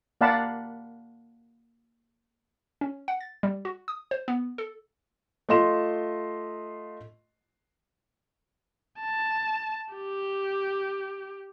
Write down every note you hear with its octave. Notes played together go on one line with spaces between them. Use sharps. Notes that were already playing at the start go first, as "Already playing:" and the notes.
A#3 D5 F5 F#5 A5 B5
C#4
F#5
A6
G3
F#4
D#6
C5
B3
A4
A3 F4 D#5 C6 E7
A5
G4